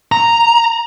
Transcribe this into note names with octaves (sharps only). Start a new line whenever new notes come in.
A#5